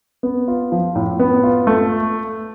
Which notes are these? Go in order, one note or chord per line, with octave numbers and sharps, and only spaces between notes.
B3
F4
F3
A2
B3
F4
A3